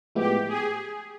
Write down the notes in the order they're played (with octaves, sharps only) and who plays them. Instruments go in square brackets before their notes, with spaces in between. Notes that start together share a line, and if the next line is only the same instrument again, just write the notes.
[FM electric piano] A2 F3 G#3 B3 E4 [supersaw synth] G4
[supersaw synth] G#4